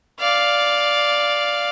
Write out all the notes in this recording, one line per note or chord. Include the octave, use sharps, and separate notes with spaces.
D5 F5